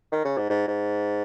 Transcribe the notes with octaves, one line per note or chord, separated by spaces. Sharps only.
D#3
C#3
G#2
G#2
G#2